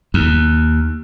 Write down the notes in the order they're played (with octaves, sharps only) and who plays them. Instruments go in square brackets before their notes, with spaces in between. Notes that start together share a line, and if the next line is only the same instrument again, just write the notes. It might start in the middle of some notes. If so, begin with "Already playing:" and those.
[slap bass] D#2